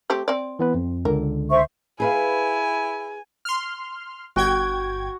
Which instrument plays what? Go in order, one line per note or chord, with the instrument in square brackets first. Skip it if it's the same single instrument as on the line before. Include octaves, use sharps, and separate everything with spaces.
[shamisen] A3 C4 G4
C4 D5
[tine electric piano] E3 B3 B4
F2
[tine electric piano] C#2 D3 [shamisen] A#4
[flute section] C5 E5 C#6
[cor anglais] E4 [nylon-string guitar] G#4 B4 F5 [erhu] G#5
[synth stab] C6 F6
[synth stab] G1 G5 G#6 [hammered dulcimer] F#4